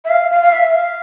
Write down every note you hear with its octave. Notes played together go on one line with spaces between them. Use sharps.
E5
F5
F5
F5
E5
F5